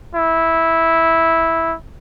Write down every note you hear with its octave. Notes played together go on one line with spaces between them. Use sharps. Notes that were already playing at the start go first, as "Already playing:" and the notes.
E4